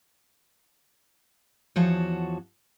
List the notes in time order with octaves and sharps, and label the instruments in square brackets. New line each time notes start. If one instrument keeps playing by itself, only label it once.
[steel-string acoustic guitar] E2 F3 F#4 C#5 A5